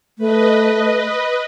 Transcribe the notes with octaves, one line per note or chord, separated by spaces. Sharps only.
A3 B4 D#5